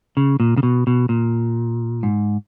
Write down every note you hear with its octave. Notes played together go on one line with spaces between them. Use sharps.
C#3
A#2
C#3
B2
B2
A#2
G#2